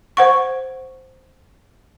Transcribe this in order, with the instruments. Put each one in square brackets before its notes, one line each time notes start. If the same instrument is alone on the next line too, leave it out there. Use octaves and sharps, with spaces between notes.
[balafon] C5 F#5 C#6